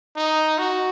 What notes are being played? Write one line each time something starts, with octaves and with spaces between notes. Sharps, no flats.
D#4
F#4